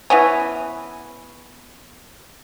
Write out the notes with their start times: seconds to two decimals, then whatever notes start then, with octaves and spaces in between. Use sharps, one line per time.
0.10 E3 B3 C#4